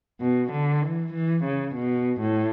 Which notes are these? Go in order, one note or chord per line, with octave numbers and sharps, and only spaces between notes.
B2
D3
E3
E3
C#3
B2
A2